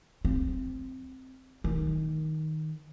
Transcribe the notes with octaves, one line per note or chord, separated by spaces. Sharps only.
C4
D#3